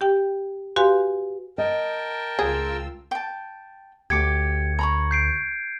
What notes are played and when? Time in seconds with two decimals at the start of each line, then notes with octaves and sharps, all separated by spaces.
0.01 G4 G5
0.76 F#4 G4 B4 F5 G#5 C6
1.58 A#4 D#5 G5 A5
2.39 C#2 F4 G#4 E6
3.11 G5 A5
4.10 D2 G4 D6 G#6 C#7
4.79 A#5 B5 C#6
5.11 G6 C7 D7